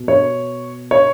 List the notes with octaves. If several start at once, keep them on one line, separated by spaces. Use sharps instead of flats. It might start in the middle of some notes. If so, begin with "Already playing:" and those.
Already playing: B2
C#5
C#5